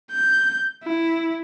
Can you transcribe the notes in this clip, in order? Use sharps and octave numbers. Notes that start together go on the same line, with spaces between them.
G6
E4